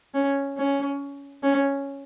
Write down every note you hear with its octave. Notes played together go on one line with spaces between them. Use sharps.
C#4
C#4
C#4